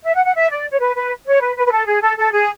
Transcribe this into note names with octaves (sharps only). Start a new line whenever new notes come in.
E5
F#5
F#5
E5
D5
C#5
B4
B4
C#5
B4
B4
B4
A4
G#4
A4
A4
G#4